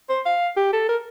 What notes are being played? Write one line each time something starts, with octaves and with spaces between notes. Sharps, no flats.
C5
F5
G4
A4
A#4